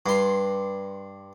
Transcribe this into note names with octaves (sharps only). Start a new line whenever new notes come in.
G2 C6